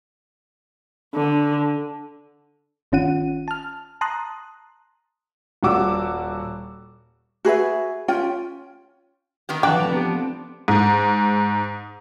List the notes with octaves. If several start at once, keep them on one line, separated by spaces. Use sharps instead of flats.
D3
G1 D#3 C#4 F4 F#5 D#7
A5 F6
A5 A#5 C6 D#6 F#6
D#1 G3 F#4 D6 E6
F#4 G#4 B4 E5
C#4 F4 G5
D#3 B3 G4
C#3 E3 F3 D4 F#4 F#5 G5 D6
F3 A3 C4 A#5 B5
B3 G4
C4
G#2